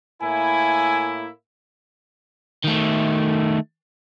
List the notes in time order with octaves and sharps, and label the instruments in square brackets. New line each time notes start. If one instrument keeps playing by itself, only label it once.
[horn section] A2 A#3 E4 [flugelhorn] G#5
[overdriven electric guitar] D#3 A3